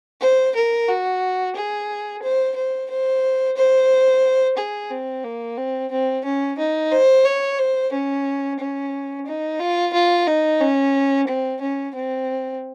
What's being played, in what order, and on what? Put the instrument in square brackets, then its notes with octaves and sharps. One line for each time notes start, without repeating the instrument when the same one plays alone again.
[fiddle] C5
A#4
F#4
G#4
C5
C5
C5
C5
G#4
C4
A#3
C4
C4
C#4
D#4
C5
C#5
C5
C#4
C#4
D#4
F4
F4
D#4
C#4
C4
C#4
C4